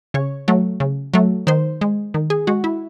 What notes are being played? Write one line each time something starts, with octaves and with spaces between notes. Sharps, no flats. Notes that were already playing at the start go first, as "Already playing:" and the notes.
C#3 C#5
F#3 A3
C#3
F#3 A3
D#3 C5
G#3
D#3
G#4
G#3 F#4
E4